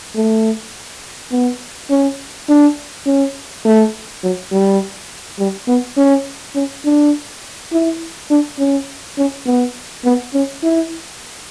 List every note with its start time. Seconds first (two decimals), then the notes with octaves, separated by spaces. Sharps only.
0.16 A3
1.31 B3
1.90 C#4
2.49 D4
3.06 C#4
3.65 A3
4.23 F#3
4.52 G3
5.39 G3
5.68 B3
5.97 C#4
6.55 C#4
6.85 D4
7.72 E4
8.30 D4
8.59 C#4
9.18 C#4
9.46 B3
10.05 B3
10.34 C#4
10.63 E4